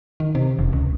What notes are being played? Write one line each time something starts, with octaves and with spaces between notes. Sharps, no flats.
D#3
C3
E1
C#2